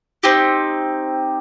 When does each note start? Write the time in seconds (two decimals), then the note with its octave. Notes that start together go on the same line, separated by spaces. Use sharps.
0.23 C4 D#4 G4